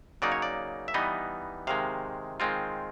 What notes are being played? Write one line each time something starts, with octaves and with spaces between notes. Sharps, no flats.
C#3 F#3 A#3 D#4 D5
C#5
D5
E5
E3 G3 B3 D#4 D#5
C3 D#3 G#3 F5
D#3 G#3 C4 F4